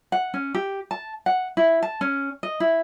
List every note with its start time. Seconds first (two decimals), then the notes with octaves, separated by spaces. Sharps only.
0.12 F#5
0.34 C#4
0.55 G4
0.91 A5
1.26 F#5
1.57 E4
1.83 A5
2.01 C#4
2.43 D#5
2.60 E4